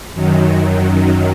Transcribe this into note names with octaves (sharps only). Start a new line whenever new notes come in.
F#2 D#3 F#3